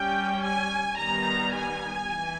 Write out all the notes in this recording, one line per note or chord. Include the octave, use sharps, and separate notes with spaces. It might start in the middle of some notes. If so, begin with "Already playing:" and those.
Already playing: G3 C#4 G5
G#5
D#3 G3 B3 A#5
G#5
E3